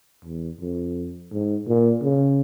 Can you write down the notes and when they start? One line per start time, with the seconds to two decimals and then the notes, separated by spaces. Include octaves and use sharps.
0.25 E2
0.61 F2
1.32 G#2
1.67 A#2
2.03 C#3